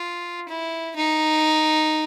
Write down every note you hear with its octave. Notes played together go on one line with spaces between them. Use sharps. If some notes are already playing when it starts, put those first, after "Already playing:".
Already playing: F4
E4
D#4